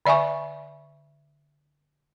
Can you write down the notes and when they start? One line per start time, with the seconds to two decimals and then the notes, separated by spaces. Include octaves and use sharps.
0.06 D3 D5 E5 G#5 C#6